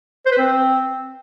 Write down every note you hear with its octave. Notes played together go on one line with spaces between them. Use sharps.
C5
B4
C4